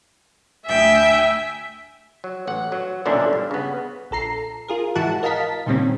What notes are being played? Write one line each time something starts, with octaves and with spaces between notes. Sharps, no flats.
D2 E5 G5 G#5
F#3
A1 F#5
F#3
B1 A#2 D3 C#4 D4 E5
G2
C#3 B3
A#1 A4 A#5 C7
F4 G#4 A#4
G#2 E3 E4 F#4 F#5 A5
A#4 D#5 F5 A5 B6
C#2 A#2 D#3 G3 C4 C#4